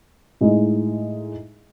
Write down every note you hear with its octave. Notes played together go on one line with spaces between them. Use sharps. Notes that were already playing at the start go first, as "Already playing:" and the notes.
A2 G#3 D#4